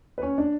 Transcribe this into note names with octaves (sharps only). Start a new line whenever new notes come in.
B4
C#4 C#5
D4 D5